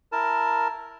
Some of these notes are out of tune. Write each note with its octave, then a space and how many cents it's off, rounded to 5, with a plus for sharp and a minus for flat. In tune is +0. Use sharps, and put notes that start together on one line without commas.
E4 +5 A#4 +0 A5 +5